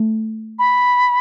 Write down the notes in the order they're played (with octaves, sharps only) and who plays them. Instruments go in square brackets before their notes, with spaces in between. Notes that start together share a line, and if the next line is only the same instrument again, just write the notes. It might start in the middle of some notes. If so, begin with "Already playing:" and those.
Already playing: [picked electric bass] A3
[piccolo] B5